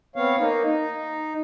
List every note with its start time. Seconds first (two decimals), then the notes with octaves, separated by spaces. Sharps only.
0.16 B3 C4 C#5 F5
0.39 A#3 D#4
0.65 D#4